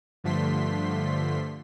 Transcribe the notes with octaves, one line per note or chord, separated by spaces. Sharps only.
G2 D3 F3 A3 C6 B6